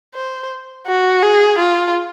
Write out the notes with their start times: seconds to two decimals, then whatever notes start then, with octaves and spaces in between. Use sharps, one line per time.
0.14 C5
0.87 F#4
1.22 G#4
1.58 F4